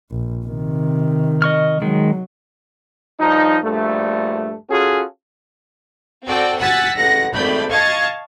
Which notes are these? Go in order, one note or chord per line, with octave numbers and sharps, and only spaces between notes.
A#1
C3 D#3
D#5 C#6 F6
D#3 F#3 G#3
G2 F3 D#4
A#1 G2 A3
C#4 F4 F#4 G#4 A4
C4 F#4 A4 D5 G5
F#5 G#5 E6 F#6 A6 B6
A1 F#5 A#6
G#1 A3 D5 B5 G6
D#5 F5 A5 C#6 G#6 A6